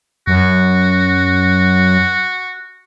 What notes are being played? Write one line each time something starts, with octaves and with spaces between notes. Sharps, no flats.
F#2 F#4